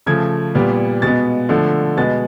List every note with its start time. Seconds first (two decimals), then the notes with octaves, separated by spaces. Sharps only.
0.06 C#3 F3 A3 G#6
0.55 A#2 G3 B3
1.02 B2 G#3 B3 A6
1.49 D3 F3 A3
1.97 B2 G#3 B3 A6